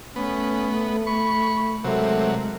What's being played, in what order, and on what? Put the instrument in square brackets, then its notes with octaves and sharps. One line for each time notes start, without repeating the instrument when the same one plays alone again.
[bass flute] A3 [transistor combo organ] B3 [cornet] C#4
[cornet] B5 [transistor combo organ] C#6
[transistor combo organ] C3 F#3 [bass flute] G#3 [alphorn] A3 [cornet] A#4